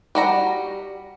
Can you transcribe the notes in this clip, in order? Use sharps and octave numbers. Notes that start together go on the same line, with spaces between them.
G3 F#4 A#5